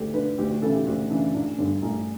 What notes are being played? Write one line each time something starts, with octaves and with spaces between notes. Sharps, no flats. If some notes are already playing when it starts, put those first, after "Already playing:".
Already playing: D2 G4 A4
D3 B4
D2 G4
F#4
C#3 E3 A4
G4
D2 F#4
C#3 E3 D4
A1 D4
G2 D3
A1